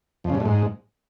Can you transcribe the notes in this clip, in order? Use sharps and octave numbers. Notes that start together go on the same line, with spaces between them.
F2
C#3
G2
A2
G#2